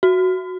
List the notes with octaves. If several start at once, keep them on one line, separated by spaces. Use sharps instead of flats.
F#4